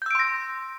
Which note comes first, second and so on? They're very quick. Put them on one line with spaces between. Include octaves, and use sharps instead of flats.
G6 E6 D7 C6 A#6